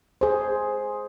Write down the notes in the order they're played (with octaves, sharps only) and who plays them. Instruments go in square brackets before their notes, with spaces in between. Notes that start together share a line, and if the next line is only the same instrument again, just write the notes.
[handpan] G#4 C5